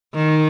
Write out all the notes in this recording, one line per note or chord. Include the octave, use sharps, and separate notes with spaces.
D#3